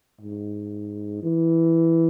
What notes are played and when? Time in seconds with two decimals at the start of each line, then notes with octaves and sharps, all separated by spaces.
0.21 G#2
1.23 E3